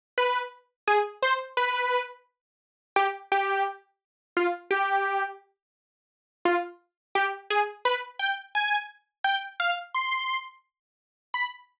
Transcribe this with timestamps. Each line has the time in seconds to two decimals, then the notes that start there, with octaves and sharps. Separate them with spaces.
0.18 B4
0.87 G#4
1.22 C5
1.57 B4
2.96 G4
3.32 G4
4.37 F4
4.71 G4
6.45 F4
7.15 G4
7.50 G#4
7.85 B4
8.19 G5
8.55 G#5
9.24 G5
9.60 F5
9.94 C6
11.34 B5